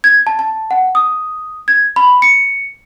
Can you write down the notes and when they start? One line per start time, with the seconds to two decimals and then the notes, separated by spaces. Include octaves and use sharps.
0.04 G#6
0.27 A5
0.39 A5
0.71 F#5
0.95 D#6
1.68 G#6
1.96 B5
2.22 C#7